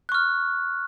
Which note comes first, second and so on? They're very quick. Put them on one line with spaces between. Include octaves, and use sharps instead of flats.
F#6 C#6 F6